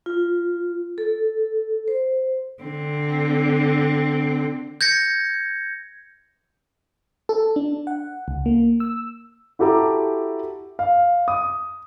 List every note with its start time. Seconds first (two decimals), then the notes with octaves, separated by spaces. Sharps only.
0.06 F4
0.98 A4
1.88 C5
2.63 D3 C4
4.81 G6 G#6 A#6 C#7
7.29 A4
7.56 D4
7.87 F#5
8.28 C#2
8.46 A#3
8.80 E6
9.59 E4 F#4 G4 A4 A#5 D6
10.79 F5
11.28 D#6